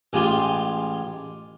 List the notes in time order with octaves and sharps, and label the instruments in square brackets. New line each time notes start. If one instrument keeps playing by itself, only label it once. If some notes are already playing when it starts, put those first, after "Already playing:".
[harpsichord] A1 G#3 F4 G4 G#5 C6